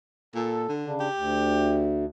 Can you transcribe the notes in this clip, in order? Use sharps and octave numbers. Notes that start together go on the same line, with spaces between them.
A#2 A4
D3
C#3 D4
G4
D2